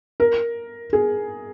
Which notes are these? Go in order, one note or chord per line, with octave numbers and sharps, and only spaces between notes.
A#4
G#4